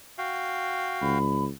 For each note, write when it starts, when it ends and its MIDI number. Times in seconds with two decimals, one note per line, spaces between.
0.18 1.18 66
0.18 1.18 77
0.18 1.18 79
1.01 1.49 37
1.01 1.44 83